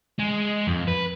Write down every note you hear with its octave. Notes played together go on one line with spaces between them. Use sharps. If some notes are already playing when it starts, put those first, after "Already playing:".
G#3
F2
B4